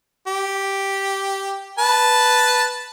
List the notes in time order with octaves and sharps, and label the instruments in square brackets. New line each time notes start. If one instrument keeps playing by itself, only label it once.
[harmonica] G4
B4 A5